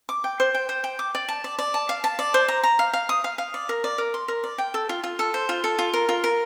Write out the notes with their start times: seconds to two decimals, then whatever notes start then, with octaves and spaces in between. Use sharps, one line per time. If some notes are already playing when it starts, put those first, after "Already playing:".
0.09 D6
0.24 G5
0.40 C5
0.55 G5
0.69 C5
0.84 G5
0.99 D6
1.15 D5
1.29 A5
1.44 D5
1.59 D5
1.74 A5
1.89 F5
2.04 A5
2.19 D5
2.34 C5
2.48 A#5
2.64 A#5
2.79 F5
2.93 F5
3.09 D#6
3.24 F5
3.38 F5
3.54 D5
3.69 A#4
3.84 D5
3.98 A#4
4.14 C6
4.28 A#4
4.44 D5
4.58 G5
4.74 A4
4.89 F4
5.04 F4
5.19 A4
5.34 C5
5.49 F4
5.64 A4
5.79 F4
5.94 A#4
6.09 F4
6.24 A#4